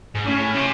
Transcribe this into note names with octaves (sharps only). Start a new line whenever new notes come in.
G#2
A2 C#4
C3